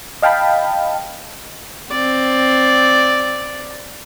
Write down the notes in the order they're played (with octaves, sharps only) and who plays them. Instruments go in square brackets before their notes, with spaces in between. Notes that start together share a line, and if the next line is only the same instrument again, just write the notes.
[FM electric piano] D#5 F5 G5 A5 B5
[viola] C4 D5